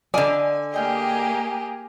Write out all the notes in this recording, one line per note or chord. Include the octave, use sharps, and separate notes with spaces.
D3 D5 D#5 F5 G#5
A#3 G4 G#4 D#5 G5 F6